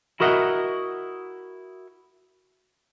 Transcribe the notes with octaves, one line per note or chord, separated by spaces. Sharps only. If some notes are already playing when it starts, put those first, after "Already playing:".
E4 F#4 A#4 D#5 E5 F#5